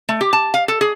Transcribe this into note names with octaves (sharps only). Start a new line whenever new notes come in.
A3
G4
A5
F5
A4
G#4